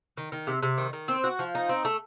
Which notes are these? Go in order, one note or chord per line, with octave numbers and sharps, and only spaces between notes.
D#3
D#3
C3
C3
D#3
D#3
C4
F#4
F3
D#4
C4
A3